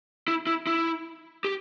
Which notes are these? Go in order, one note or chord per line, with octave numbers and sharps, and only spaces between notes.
E4
E4
E4
G4